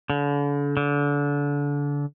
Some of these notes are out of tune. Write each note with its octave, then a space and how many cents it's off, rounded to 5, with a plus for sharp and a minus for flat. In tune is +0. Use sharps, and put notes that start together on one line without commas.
D3 -40
D3 -30